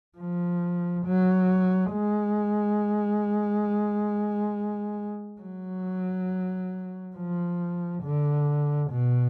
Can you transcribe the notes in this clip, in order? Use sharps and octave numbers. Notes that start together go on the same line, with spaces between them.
F3
F#3
G#3
F#3
F3
D3
B2